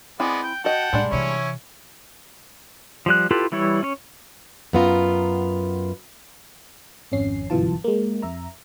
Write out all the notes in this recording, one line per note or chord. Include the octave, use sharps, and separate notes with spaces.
G#3 B3 C4 E4 D5 G#5
G5
F#4 D#5 F#5 G5 A5
A2 G3 G#3 D4
C3 E3 C#4 E4 C#5
F3 G3 F#6
E4 F4 G4 A4 B4
E3 G3 E4 C#5
C#4 C#5
F#2 B3 F4 A#5
G#1 F2 C#4 C7
G1 F#2 B2 E3 F4 A5
G#3 A#3
F2 E5 A#5